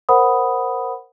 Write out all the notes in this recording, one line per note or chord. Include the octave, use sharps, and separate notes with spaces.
A#4 C5 F#5 B5 D#6